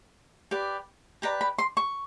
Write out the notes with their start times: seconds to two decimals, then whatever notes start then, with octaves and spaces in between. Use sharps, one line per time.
0.51 G4 B4 D5
1.22 G4 B4 D5 A#5
1.41 B5
1.58 C6
1.77 C#6